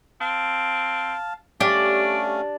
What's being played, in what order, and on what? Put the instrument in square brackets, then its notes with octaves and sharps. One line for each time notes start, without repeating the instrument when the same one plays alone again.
[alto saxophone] C4 [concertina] F5 A5
[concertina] A3 C#4 F5 [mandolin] D4 [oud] G4 [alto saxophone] D5